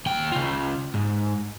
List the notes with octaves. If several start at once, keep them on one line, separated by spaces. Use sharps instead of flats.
D#2 G5
C#3 F4
G#2